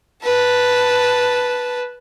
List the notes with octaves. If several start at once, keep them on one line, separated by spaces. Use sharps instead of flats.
B4 A5